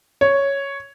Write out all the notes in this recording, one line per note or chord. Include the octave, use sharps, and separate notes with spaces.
C#5